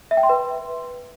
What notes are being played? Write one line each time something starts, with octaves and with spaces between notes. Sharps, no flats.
E5
G5
C6
B4